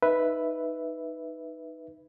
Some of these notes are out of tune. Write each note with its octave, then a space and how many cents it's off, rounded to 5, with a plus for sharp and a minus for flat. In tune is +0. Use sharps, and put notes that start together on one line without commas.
D#4 +0 B4 +0 E5 +0